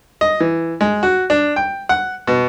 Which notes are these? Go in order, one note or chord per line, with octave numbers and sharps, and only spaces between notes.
D#5
E3
G#3
F#4
D4
G5
F#5
B2